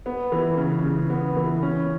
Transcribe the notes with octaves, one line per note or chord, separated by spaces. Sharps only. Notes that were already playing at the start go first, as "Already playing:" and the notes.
B3
E3
C#3
C#3
B3
E3
C#4